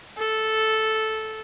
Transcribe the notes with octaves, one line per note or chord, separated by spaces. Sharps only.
A4